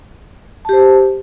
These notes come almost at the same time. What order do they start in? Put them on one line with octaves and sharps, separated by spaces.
A5 G4 C5